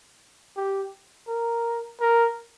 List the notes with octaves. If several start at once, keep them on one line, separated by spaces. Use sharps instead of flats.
G4
A#4
A#4